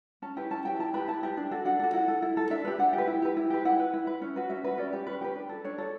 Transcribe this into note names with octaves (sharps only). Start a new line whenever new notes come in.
C#4 A5
E4 G4 B4
C#4 A5
E4 G4 B4 G5
E4 A5
G4 B4 B5
E4 A5
G4 B4
D4
F#4 A4
D4 F#5
F#4 A4
E4 F#5
A4
E4
A4
D4 E5
G4 B4
D4 F#5
G4
B4
E4
G4 B4
E4
G4 B4
E4 F#5
B4
E4
B4
C#4
F#4 B4
C#4 E5
F#4 B4
C#4 D5
G4 B4
C#4 B4
G4 B4
D4
A4
D4 C#5
A4